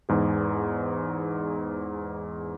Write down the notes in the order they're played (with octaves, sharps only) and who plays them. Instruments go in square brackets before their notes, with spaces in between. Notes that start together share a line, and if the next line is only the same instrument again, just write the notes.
[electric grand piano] E2 G#2 G#4